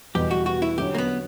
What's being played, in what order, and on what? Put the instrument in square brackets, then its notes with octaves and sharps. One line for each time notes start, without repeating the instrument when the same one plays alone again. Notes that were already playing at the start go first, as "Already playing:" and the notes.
[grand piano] E2 B2 G3 B3 [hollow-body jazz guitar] G4
[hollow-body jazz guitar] F#4
F#4
E4
[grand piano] D3 F#3 C#4 [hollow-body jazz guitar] G4
[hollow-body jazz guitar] A#3
B3